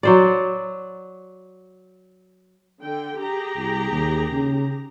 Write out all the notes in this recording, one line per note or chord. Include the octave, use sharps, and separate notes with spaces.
F#3 C5 D5
D3 G5
G4 G#4 A#5
C2
D#2
C#3